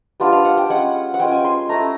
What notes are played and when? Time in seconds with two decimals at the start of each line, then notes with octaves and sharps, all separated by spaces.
0.20 G3 B3 D4 F4
0.32 F5
0.45 F#5
0.57 G5
0.70 G#3 C#4 F4 F#5
1.14 F#5
1.19 G#3 C#4 F4 G5
1.31 G#5
1.44 C6
1.69 A3 C#4 E4 A#5